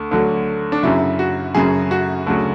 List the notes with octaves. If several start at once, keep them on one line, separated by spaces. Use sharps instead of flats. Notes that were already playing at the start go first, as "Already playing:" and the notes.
Already playing: D2
D2 D3 F#3
D4
F#2 C#3 F#3 E4
F#4
F#2 C#3 F#3 G#4
F#4
D2 C#3 F#3